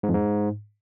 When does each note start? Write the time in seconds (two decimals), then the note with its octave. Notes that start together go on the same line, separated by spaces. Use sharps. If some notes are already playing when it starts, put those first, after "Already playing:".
0.03 G#2
0.09 F2
0.14 G#2